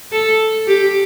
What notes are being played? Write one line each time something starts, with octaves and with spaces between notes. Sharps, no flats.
A4
G4